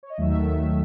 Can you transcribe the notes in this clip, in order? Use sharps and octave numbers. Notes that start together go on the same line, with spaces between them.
C#5
D#5
D#2 D#3 F#3 A3 E5